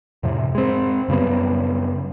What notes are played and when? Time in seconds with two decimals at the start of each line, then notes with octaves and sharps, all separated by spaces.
0.23 F2 A2 C3
0.55 G#3 C4
1.08 F#2 C#3 G3 B3